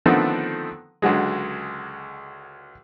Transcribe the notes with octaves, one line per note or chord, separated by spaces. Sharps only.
D3 D#3 F3 A3 B3 C4
C#2 D3 F#3 G#3